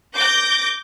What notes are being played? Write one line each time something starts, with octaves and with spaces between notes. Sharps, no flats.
D6 G6 A#6